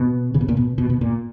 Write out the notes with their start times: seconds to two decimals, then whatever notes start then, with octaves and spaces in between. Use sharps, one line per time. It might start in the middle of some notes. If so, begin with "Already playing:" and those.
Already playing: B2
0.34 C#3
0.41 B2
0.48 A#2
0.57 B2
0.78 B2
0.90 B2
1.01 A#2